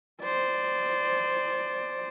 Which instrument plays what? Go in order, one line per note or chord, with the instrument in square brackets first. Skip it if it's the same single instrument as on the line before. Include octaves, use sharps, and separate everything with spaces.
[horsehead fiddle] C5 D5